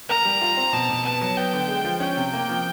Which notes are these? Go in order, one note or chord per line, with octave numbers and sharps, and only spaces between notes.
A#4 A#5
G3
F4
C4
B2 A5
B2
B3 A5
F#3
B3 G5
D3
G#3
F3
C#4 G5
C3
A#3
F3